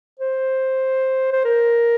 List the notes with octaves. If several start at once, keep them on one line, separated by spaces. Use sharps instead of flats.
C5
C5
A#4